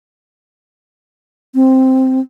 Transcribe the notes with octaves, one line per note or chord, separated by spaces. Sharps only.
C4